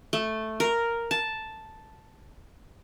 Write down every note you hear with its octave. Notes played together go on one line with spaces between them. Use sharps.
A3
A#4
A5